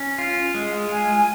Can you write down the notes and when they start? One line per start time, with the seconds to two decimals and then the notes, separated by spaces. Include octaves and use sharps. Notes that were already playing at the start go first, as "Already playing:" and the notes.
Already playing: C#4
0.18 F4
0.55 G#3
0.89 F4 G#5